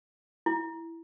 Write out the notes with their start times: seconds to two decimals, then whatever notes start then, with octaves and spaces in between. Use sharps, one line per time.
0.46 E4